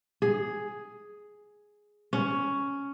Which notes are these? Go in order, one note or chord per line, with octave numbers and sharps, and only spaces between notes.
G#4
C#4